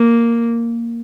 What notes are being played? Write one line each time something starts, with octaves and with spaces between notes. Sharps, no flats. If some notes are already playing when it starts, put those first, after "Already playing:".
Already playing: A#3